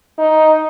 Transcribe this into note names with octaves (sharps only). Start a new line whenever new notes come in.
D#4